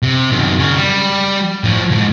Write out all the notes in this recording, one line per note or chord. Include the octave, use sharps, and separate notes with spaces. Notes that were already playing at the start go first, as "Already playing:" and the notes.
C3
F#2 D#3
C#3 A#4
G3
A2 F3
D2 G#2